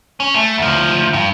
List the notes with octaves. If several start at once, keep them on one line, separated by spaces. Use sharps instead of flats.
C#4
A3
D2 F3
G2